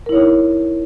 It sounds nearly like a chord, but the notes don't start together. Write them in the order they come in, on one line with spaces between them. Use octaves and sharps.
A#4 E4 C#5 D#4